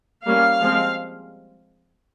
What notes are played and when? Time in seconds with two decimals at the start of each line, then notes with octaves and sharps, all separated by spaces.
0.25 G3 A#3 C#4 F5
0.61 F3 G#3 C4